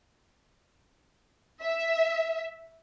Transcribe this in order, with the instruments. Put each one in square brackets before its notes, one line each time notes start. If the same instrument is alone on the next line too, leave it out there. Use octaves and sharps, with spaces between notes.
[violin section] E5